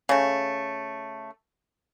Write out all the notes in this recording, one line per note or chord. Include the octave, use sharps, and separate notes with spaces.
C#3 A3